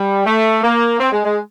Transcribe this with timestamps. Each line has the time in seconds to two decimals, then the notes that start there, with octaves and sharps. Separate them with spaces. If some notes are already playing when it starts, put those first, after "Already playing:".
Already playing: G3
0.25 A3
0.63 A#3
1.00 C4
1.12 G#3
1.25 G#3